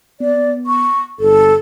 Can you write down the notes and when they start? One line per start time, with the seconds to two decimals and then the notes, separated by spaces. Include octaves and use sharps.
0.20 B3 D5
0.66 C#6
1.19 G1 A4